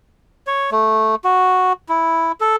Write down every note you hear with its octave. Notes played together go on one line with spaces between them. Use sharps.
C#5
A3
F#4
E4
A4